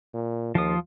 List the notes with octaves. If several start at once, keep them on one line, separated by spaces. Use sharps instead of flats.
A#2
D#2 F3 F4 D#6